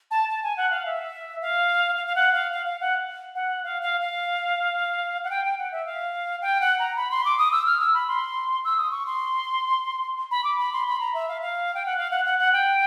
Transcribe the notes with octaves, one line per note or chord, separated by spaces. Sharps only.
A5
A5
G#5
F#5
F5
E5
F5
F5
F5
F#5
F5
F5
F5
F#5
F#5
F5
F5
F5
F#5
G5
G5
F#5
E5
F5
G5
F#5
A#5
B5
C6
D6
D#6
E6
F6
E6
B5
C6
E6
D#6
C#6
C6
B5
D6
B5
C6
B5
A#5
E5
F5
F5
G5
F#5
F5
F#5
F#5
F#5
G5